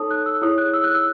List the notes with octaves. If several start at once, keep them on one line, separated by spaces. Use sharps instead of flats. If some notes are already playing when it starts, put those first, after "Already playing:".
Already playing: D#4 A4 C#5 A5 D#6
F#6
E6
E4 G#4 C#5 D#6
F#6
E6
F#6
E6